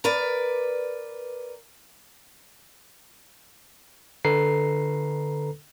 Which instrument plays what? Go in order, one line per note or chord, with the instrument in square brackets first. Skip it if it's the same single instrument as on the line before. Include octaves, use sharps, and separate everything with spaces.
[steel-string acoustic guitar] A#4 B4 D5
[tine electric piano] D3 A4 B4 A#5 C7